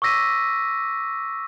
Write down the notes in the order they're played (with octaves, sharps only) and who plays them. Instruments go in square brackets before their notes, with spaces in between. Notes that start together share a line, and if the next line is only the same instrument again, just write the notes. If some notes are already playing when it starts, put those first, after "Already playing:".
[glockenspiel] C#6 D6 E6 A#6 B6 D#7